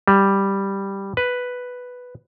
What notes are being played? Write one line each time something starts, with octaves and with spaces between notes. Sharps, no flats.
G3
B4